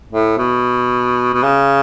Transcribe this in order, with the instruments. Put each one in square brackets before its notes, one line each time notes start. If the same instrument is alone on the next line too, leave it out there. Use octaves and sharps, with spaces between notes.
[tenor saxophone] A2
B2
B2
C#3